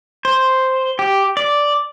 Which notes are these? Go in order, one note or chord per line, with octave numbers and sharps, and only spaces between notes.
C5
G4
D5